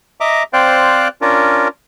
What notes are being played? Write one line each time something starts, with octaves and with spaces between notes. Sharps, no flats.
D#5 E5 A#5 D6
C4 C5 D5 F5 G5 F#6
C#4 D4 F4 A#4